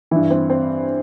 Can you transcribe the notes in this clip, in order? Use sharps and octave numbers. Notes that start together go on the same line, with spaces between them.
G2 E3 E4
C4
C4